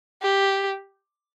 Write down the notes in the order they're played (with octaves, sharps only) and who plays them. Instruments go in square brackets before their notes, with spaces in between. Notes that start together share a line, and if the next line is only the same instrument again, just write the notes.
[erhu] G4